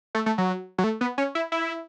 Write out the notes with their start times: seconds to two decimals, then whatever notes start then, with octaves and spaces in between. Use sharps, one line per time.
0.15 A3
0.26 A3
0.38 F#3
0.78 F#3
0.84 A3
1.01 B3
1.18 C#4
1.35 E4
1.52 E4